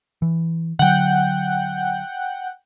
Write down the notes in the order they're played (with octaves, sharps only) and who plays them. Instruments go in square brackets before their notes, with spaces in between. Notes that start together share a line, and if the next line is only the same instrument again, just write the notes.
[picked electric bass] E3
[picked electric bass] D3 F#3 [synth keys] F#5 G5